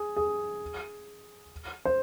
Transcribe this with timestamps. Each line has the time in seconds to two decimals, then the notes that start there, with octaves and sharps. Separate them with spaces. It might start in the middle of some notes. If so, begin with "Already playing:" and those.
Already playing: G#4
0.16 G#4
1.85 C5